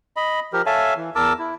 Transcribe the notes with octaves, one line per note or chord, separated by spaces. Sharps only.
D#5 B5
F3 G4 A#4
A4 C#5 E5 F5 G#5 A5
E3
E2 A#4 A5 D6 E6
E4